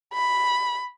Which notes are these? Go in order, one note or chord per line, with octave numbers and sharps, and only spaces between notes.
B5